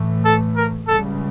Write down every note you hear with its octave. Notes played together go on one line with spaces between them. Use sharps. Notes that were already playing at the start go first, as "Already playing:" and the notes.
Already playing: A2 E3 A3
A4
A#4
C#2 C#3 G3 A4